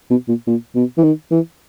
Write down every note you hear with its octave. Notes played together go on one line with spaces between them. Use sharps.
B2
A#2
A#2
B2
E3
D#3
E3